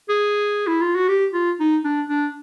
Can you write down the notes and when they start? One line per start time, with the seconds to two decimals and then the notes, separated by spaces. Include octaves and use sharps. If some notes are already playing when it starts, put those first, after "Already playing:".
0.09 G#4
0.67 E4
0.81 F4
0.96 F#4
1.08 G4
1.33 F4
1.60 D#4
1.84 D4
2.09 D4